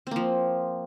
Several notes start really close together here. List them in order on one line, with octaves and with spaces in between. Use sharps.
C4 A#3 F3